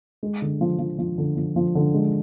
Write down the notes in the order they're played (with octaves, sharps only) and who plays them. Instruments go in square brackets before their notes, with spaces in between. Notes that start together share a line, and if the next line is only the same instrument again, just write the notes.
[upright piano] G#3
D3
F3
F3
F3
D3
F3
F3
D3
G#3